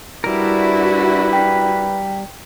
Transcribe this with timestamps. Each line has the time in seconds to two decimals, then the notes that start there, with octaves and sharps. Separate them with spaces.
0.24 G3 D4 E4 F#4 A#4 B4
1.33 G5 B6